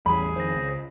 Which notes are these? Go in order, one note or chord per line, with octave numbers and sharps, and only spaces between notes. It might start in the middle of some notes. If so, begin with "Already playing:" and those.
A1 E2 G3 G#4 B5
F2 D#3 C5 A#6
C#2